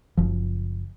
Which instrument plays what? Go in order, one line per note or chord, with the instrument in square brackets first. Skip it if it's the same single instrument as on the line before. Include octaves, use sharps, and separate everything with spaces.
[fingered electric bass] F#1 F3